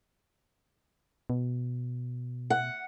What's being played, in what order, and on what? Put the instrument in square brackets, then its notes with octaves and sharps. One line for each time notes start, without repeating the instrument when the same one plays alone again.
[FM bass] B2
[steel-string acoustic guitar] F#5